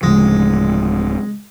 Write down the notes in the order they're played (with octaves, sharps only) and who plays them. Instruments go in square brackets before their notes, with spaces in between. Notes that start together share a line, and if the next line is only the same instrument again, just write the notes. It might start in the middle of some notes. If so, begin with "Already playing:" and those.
[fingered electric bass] D1 C#3 F3 [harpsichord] G#3